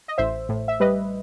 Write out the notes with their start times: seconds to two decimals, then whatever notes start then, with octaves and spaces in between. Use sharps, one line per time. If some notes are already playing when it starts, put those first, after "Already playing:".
0.08 D#5
0.18 A1 C5 E5
0.49 A2
0.68 E5
0.80 G3 B4 D#5